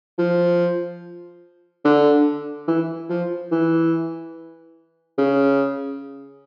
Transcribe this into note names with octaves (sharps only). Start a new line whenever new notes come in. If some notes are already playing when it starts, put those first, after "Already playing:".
F3
D3
E3
F3
E3
C#3